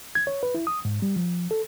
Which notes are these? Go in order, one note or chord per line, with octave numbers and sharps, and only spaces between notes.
G#6
C#5
B4
E4
D#6
G#2
G3
F3
A4